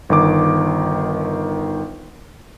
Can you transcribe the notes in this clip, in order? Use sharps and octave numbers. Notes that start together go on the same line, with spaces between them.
G1 D#3 D6